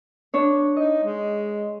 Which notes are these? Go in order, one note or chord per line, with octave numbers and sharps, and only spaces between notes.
D4 C#5
D#4 D#5
G#3